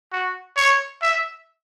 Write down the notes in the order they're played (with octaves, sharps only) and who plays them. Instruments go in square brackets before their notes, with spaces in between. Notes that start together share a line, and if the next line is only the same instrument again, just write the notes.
[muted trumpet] F#4
C#5
E5